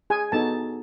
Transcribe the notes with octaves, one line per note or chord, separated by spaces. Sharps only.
G#4 G#5
B3 D#4 F#4 A4 A5